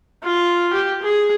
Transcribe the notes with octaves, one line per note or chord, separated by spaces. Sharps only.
F4
G4
G#4